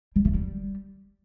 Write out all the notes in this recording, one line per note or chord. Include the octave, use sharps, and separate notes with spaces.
G3
A3
G3